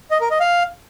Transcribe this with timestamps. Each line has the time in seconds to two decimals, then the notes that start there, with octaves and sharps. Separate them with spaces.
0.11 D#5
0.21 A#4
0.30 D#5
0.40 F5